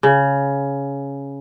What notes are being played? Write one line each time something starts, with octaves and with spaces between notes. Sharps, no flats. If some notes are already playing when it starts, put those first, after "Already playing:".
C#3